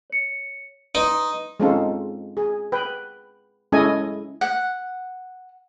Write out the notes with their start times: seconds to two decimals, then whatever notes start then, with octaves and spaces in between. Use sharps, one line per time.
0.10 C#5 C#7
0.95 D#4 B4 C6 D#6
1.60 G#3 C4 C#4 D#4 F4 A4
2.37 G#4
2.72 B4 G5
3.72 G#3 C#4 E4 A4 D#5 G#5
4.41 F#5